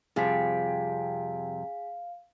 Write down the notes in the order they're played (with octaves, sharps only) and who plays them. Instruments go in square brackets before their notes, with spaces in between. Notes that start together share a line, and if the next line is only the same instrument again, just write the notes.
[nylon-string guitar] F2 C3 G3 [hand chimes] G#4 G#5 B6 [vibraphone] F5